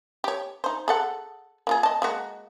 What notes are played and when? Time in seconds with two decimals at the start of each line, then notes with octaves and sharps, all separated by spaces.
0.24 G4 C#5
0.64 D#4 C5
0.88 G#4 A4 F#5
1.67 A#3 F4 G#4
1.83 D#5 A5
2.02 G#3 A#3 F#4